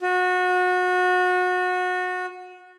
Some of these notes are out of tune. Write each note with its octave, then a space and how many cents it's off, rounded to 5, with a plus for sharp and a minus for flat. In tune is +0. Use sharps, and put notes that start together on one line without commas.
F#4 -30